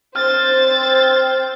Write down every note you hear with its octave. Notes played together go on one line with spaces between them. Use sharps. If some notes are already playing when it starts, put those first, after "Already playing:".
C4 C5 F6 A6